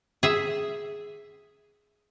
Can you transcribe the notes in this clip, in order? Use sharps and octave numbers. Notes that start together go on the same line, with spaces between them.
G#4 E5